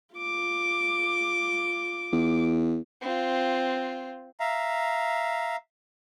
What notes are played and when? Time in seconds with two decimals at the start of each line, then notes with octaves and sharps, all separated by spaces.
0.15 F4 D6
2.12 E2
3.02 C4 F4
4.40 E5 F5 A#5